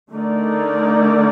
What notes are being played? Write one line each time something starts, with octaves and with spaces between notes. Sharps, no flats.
D3 A3 D#4 A#4 D5